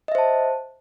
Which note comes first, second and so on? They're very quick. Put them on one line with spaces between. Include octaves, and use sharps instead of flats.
D#5 E5 C5 A5